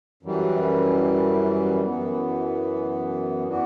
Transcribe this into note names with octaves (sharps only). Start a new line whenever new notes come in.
F#2 E3 G3
F#2 E3 B3
E3 B3 D4 F#4